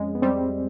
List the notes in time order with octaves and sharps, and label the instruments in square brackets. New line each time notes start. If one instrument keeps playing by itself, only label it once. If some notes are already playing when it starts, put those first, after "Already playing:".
Already playing: [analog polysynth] F2 G#3 [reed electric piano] C#4
[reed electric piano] B3
[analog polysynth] G3 [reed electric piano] C4